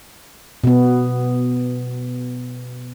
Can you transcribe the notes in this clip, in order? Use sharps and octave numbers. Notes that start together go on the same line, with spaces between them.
B2 B3